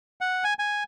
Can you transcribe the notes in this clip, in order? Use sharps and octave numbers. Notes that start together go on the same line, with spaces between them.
F#5
G#5
G#5